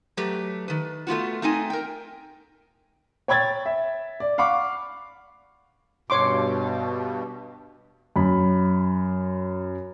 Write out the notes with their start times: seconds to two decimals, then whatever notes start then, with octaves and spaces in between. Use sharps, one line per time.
0.17 F#3 A3 G4 B4
0.68 D#3 B4
1.07 A3 B3 F4 F#4
1.42 A3 C4 D#4 G#5
1.70 A#4 G5
3.28 C#5 G5 B5 G#6 A6
3.66 E5
4.20 D5
4.38 F5 F#5 B5 C#6 D6
6.10 G2 B2 C#5 C6 D6
8.16 F#2 B5